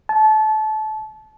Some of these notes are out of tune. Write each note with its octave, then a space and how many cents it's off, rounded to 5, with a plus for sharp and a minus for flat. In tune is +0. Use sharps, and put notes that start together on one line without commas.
A5 -25